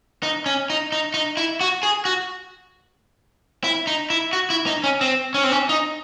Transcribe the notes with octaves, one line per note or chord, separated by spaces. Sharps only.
D#4
C#4
D#4
D#4
D#4
E4
F#4
G#4
F#4
E4
D#4
E4
F#4
E4
D#4
C#4
C4
C#4
C4
C#4
D#4